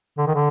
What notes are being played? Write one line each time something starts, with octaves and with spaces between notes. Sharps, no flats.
D3
D#3
D3